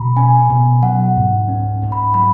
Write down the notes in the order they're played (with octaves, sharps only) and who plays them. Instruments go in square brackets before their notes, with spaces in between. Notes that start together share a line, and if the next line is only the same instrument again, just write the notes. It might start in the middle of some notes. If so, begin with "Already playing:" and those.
Already playing: [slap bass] B2 A#3 [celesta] A#5 B5
[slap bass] C#4 [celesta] G#5
[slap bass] B2
[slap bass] F#3 [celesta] F#5
[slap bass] G#2
C#4
G#2
[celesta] B5
[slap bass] F#3 [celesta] B5